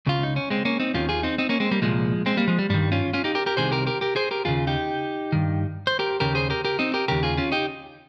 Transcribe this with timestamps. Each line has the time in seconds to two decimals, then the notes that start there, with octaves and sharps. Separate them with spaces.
0.06 C#2 C#3 F4
0.23 D#4
0.36 C#4
0.50 G#3 C4
0.65 A#3 C#4
0.80 C4 D#4
0.94 D#2 D#3 C#4 F4
1.09 F4 G#4
1.23 C4 D#4
1.38 C4 D#4
1.49 A#3 C#4
1.60 G#3 C4
1.71 G3 A#3
1.82 C2 A#2 F3 G#3
2.26 G#3 C4
2.37 G3 A#3
2.48 F3 G#3
2.59 G3
2.69 G2 D#3 G3
2.92 C#4 F4
3.13 C#4 F4
3.24 D#4 G4
3.35 G4 A#4
3.46 G4 A#4
3.57 C2 C3 D#3 G#4 C5
3.72 G4 A#4
3.87 G4 A#4
4.01 G4 A#4
4.16 G#4 C5
4.31 G4 A#4
4.45 D#2 C#3 F4 G#4
4.67 D#4 G4
5.32 G2 D#3
5.87 C5
5.99 G4 A#4
6.20 D#2 C#3 G4 A#4
6.35 G#4 C5
6.50 G4 A#4
6.65 G4 A#4
6.79 C4 D#4
6.94 G4 A#4
7.08 D#2 C#3 G4 A#4
7.23 F4 G#4
7.37 C#4 F4
7.52 D#4 G4